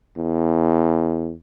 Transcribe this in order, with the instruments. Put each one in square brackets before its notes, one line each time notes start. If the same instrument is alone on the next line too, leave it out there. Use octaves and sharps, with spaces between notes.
[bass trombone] E2